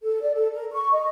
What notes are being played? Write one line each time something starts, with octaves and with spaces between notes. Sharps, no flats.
A4
D5
A4
A#4
C#6
D#5